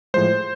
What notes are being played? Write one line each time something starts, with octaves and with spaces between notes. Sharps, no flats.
A2 F3 G#3 C5